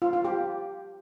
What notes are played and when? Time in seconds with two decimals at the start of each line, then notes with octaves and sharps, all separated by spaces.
0.02 F4
0.13 F4
0.25 G4